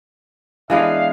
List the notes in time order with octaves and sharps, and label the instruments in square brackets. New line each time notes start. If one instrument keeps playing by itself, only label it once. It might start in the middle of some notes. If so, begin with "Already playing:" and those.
[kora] E3 G#3 B3 [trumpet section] D4 F5